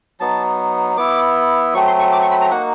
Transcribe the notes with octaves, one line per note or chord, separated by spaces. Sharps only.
F#3 B3 D#4 A5
B3 E4 D6
F#3 A3 C4 C#6
C6
C#6
D6
C#6
B5
A#5
A#3 D#4 F#4 F#5